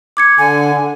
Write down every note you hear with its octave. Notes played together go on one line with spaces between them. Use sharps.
D6 G#6 C#7
D3 G#5